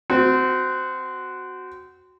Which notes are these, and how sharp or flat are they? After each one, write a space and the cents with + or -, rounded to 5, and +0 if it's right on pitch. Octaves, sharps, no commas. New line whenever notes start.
C4 -20 F#4 +0